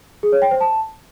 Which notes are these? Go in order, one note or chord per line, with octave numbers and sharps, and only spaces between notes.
G#4
C#5
G5
C5
A5